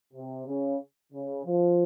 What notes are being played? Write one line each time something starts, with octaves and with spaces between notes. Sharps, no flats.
C3
C#3
C#3
F3